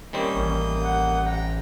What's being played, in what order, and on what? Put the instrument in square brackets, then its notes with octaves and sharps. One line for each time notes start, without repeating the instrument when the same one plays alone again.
[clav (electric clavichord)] D#3 G3 C4 [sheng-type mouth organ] A#3 D#6 G6 [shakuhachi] C#4
[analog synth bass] A1
[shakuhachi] F#5
[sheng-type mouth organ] G5 A#5